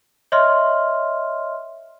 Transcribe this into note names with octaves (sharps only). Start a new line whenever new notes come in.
C#5 D#5 E5 C6 F6